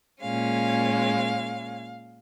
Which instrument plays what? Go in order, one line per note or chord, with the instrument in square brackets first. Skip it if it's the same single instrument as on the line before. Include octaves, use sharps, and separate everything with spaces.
[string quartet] A#2 G#3 C#4 F5